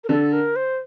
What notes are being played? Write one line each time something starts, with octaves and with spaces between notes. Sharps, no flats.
A#4
D3 A4
A#4
C5